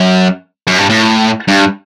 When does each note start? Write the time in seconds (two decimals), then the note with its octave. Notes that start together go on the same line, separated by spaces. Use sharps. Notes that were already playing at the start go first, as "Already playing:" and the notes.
Already playing: F#2
0.67 F#2
0.78 G2
0.90 A2
1.48 G2